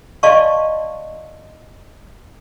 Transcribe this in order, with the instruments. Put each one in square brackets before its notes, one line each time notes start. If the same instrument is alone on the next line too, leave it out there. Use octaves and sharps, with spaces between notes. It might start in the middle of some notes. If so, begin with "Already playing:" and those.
[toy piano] D5 D#5 F5 A5 C6 C#6